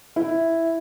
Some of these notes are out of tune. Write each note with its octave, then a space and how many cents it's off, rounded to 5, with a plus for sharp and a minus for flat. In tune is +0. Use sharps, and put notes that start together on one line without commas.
E4 +0